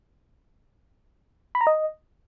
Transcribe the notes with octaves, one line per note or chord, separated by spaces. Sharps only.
B5
A#5
D#5